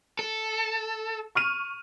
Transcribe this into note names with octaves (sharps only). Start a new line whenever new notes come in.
A4
C#6 F6 D#7